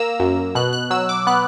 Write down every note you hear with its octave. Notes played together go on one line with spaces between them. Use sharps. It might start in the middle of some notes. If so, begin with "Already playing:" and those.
Already playing: A#3 A#5 E6
F#2
B2 F#6
F#6
F#3 E6
D6
B3 F#6